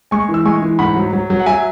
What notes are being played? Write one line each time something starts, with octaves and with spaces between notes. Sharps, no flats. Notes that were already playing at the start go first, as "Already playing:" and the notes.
G#3 G#5 C#6
E3
E6
G#3 G#5 C#6
E3
G#2 F#5 B5
F#3
F#3
F#3
F#5
F#3 E5 G#5